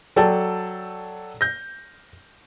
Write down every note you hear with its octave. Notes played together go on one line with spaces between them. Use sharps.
F#3 A4 D5 G5 A5
G6 A#6